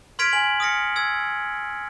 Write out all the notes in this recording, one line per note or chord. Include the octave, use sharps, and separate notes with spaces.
C6 F6 G#6 B6 D7 F7
G#5 F#7
D#6 F6 A#6 C#7
E6 G#6